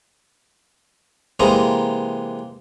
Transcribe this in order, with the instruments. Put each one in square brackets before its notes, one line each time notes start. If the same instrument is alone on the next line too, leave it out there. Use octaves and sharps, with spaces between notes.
[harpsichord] C3 E3 G#3 A#3 A#5